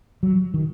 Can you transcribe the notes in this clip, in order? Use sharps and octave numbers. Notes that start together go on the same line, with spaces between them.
F#3
D#3